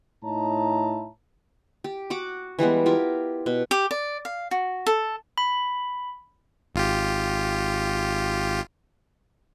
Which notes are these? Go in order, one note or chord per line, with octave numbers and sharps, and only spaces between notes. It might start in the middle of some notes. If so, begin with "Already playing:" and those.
A2 D#4 E4 C#5 A5 A#5
G4
F#4 F#5 D6
E3 G3 G#3 B3
E4 F4 G4 A#4
B2
G4
D5
F5
F#4
A4
B5
G#1 F4 G4